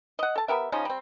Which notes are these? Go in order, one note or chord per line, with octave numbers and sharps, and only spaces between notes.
D#5 F#5
A4 A5
B3 G4 A#4 E5
C#3 F3 C#4 D#4
G3 C4